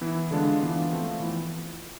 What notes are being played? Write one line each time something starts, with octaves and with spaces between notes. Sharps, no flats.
E3 B3 E4
D3 G#3 D4 F4
E3 B3 D4 F4
F3 A3 C4 F4
E3 B3 E4